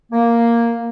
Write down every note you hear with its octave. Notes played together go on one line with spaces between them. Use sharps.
A#3